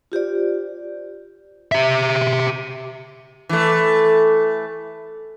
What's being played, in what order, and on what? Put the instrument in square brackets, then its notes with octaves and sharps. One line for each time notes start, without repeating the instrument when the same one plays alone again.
[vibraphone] F4 G4 C5 D5
[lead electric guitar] G4 E5
[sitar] E3 A3